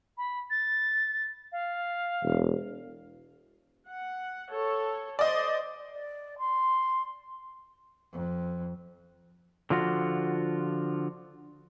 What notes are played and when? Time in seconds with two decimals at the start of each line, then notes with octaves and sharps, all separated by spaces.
0.17 B5
0.50 A6
1.52 F5
2.23 E1
3.90 F#5
4.50 A4 C#5
5.19 C5 D5 D#5
5.92 D5
6.39 C6
8.13 F2
9.70 D3 F3 F4 F#4